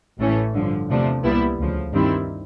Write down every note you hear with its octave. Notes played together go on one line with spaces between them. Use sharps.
A1 A2 E3 A3 C#4
G2 D3 F3
E2 C3 F3 A3 D4
C2 A#2 G3 B3 E4
D2 C#3 F3
G2 D#3 G3 C4 E4